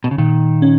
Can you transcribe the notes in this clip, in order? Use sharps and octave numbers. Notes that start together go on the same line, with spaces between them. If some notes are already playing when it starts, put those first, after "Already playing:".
B2
C#3
A#2 D#3
C#4